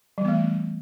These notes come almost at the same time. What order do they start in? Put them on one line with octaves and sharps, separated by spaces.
G3 E3 B3 A3